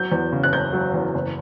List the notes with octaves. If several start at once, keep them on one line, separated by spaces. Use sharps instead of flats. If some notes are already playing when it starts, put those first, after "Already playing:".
Already playing: F#3 G6
E2
C#3
F#6
F#1 G6
F#3
E2
F#1